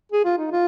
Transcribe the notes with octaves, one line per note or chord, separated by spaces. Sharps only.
G#4
F4
D#4
F4